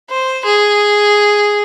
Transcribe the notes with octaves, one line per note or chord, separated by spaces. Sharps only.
C5
G#4